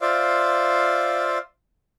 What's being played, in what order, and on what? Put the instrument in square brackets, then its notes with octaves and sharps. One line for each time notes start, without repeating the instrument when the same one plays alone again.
[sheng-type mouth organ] F4 C5 D5 E5 F5